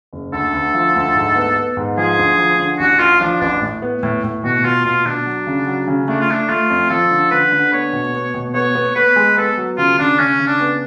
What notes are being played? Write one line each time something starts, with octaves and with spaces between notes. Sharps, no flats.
F#1
D2 A4
D2
F3
D2
G#2
B3
B3
G#2
F3 G#4
D2
F3
D3
A1 F#4
A1 F4
F3 D4
A1 D4
A2
B3
A2
A2
B2 F#4
B2 F4
B2 F4
B2 D4
F#3
C#3
F#3
C#3
A3 D4
F4
A3 D4
A3 F4
F2
F3 A4
D3
D3 B4
D3
B3 C#5
B2
B3
B2
B3 C#5
B3
B3 B4
G#3
B3 A4
F#3
C#3 F4
C#3 D4
C#3 C#4
C#3
D4
B3